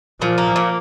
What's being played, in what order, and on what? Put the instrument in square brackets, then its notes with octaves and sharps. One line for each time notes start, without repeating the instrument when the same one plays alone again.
[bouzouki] A#2 [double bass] F3
[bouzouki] A#3
A#2